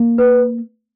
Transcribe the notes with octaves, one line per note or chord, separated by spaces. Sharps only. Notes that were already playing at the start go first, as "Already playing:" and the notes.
Already playing: A#3
B4